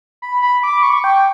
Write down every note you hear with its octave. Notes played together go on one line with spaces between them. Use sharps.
B5
B5
D6
C#6
G5